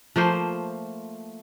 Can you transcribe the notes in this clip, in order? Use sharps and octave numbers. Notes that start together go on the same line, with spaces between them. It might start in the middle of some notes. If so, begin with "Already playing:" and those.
F3 A3 A#3 C5